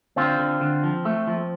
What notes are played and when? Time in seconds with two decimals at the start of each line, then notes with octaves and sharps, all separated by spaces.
0.16 D3 C4 F4
0.39 D3
0.61 D3
0.84 F3
1.05 A3
1.27 F3